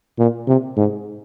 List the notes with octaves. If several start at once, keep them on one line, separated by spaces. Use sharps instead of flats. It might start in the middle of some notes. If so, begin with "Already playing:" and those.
A#2
C3
G#2